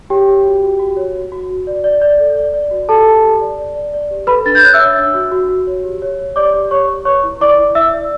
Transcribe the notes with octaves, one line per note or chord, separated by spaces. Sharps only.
G4 C#5 G5
C#5
F#4
F#4
F#4
C#5
F#4
F#4
F#4
D5
D5
D5
A4
D5
D5
F#4
G4 A4 A5
G4
G4
D5
D5
D5
D5
G4
A4 B4 B5
D4 A6
G6
C#5 F#6
E5 E6
C#5
D4
F#4
F#4
F#4
C#5
G4
C#5
C#5
G4 D5 D6
G4
G4 C#5 C#6
C#5
B4 C#5 C#6
E4
E4 D5 D6
E4
E4 E5 E6
D5